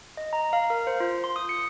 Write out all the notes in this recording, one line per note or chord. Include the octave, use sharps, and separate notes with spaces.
D#5
A#5
F5
A#4
C5
F4
C6
D#6
C#7